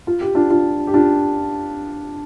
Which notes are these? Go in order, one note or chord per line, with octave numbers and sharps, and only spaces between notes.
F4
G4
D4 F4
D4 F4
G4
D4 F4